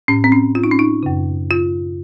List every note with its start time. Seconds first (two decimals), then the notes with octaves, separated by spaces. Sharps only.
0.08 A2 C#4
0.24 C4
0.32 C#4
0.55 F4
0.64 D#4
0.71 C#4
0.79 D#4
1.03 F#2 C#3
1.51 F4